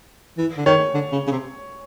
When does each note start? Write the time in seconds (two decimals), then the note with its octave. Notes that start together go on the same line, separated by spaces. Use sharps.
0.38 E3
0.57 D3
0.66 D#3 C#5
0.94 D3
1.12 C#3
1.27 C#3
1.31 C3